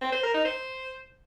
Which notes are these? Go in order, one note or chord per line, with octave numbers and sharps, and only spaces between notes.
C4
C5
A#4
D#4
C5